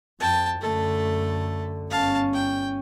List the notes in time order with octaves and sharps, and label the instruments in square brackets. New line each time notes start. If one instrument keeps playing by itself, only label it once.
[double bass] F2 [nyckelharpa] G5 A5
[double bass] F#2 D3 [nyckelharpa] A3 A4
[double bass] G1 C#4 [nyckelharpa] F5 A5
[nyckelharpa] G5